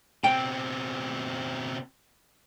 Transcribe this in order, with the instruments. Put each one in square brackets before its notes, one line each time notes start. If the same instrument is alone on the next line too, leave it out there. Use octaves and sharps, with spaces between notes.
[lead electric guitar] B2 C4 [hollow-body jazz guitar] G5